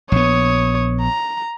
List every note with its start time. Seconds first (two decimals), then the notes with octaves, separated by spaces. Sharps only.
0.12 A#1 B3 C#5 D#6
1.01 A#5